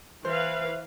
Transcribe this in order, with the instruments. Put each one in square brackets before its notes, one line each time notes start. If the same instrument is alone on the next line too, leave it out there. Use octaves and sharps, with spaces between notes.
[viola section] E3 B4 F5 [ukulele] C5 E5